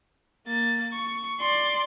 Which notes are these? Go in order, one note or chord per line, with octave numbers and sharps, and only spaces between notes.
A#3 A6
C#6
D5 C6